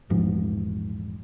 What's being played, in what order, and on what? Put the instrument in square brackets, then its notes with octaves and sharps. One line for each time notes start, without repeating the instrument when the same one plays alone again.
[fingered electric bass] A#1 E2 G#2 F3